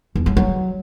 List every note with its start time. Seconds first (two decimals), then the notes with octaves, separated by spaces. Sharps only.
0.15 E2
0.26 F#3
0.37 F#3